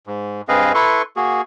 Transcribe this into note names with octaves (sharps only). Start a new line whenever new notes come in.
G#2
G2 C4 G#4 B4 D#5 F5
E4 A4 B4 C6 C#6
A#3 F#4 G#4